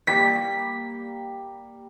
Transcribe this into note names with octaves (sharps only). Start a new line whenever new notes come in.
G3 A#3 B6